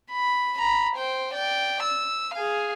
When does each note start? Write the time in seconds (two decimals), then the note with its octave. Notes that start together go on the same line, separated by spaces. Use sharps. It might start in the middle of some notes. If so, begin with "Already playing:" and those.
0.11 B5
0.58 A#5 B5
0.96 C5 G5
1.33 D5 G5
1.83 E6
2.34 G#4 F5